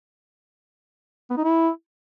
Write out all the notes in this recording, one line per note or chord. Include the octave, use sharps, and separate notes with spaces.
B3
D#4
E4